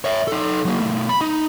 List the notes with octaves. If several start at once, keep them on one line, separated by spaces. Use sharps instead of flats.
C#5 E5
D#4 A4
F#3 A#3
B2 A3
B5
D#4